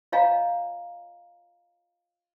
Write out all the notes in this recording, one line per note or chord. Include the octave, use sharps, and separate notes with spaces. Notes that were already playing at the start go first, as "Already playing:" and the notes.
F4 C#5 D#5 F5 G#5 A#5